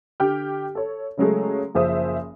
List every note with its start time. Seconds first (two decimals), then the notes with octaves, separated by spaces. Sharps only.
0.20 D3 G4 G5 F6
0.75 A4 C#5
1.17 C#3 F#3 G#3 A3
1.75 F#1 F3 G#4 C5 E5 D#6